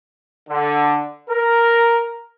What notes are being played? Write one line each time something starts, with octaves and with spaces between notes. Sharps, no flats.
D3
A#4